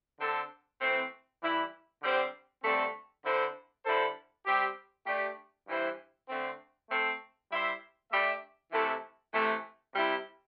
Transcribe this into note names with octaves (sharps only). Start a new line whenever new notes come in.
D3 C4 A4
E3 A3 C4
E3 G3 E4
D3 G3 C4 G4 C5
G2 D3 A3 C4 A4
D3 C4 E4 A4 C5
D3 G3 E4 A4 C5
G3 C4 G4
A3 D4 G4
G2 E3 G3 E4 C5
D3 A3 C4
A3 C4 A4
G3 E4 C5 E5
A3 D4 G4 E5
C3 E3 A3 E4 A4
C3 E3 A3
C3 G3 E4